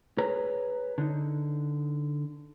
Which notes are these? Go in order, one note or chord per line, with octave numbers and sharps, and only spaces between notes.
G#4 B4 C#5 A#5
D3 D#4